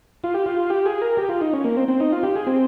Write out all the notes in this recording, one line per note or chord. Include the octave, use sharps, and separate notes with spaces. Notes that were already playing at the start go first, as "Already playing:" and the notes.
F4
G4
F4
G4
G#4
A#4
G4
F4
D#4
C#4
A#3
C4
C4
D#4
F4
G4
G#4
C4